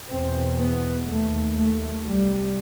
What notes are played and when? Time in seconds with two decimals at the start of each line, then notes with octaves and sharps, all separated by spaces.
0.11 E2 B2 C4
0.60 B3
1.08 D#2 A3
1.56 A3
2.05 C2 C3 G3